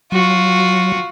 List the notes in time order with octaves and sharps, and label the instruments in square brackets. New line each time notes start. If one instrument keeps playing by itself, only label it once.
[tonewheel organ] F#3 [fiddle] F4 F#4